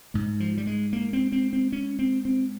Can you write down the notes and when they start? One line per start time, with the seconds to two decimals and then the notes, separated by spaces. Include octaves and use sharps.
0.14 G#2 G#3
0.40 F3
0.58 G3
0.67 G#3
0.93 A#3
1.13 C4
1.32 C4
1.53 C4
1.72 C#4
1.99 C4
2.25 C4